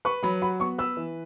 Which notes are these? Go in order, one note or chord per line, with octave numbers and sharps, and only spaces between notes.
B4 C#6
F#3 B5
F#4 B5
B3 C#6
B4 E6
E3